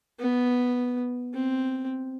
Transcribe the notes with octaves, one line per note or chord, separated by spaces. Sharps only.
B3
C4